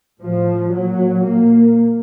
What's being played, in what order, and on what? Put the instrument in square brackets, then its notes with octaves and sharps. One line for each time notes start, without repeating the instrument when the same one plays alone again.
[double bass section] A2 F3
A#2 F#3
A#2 A#3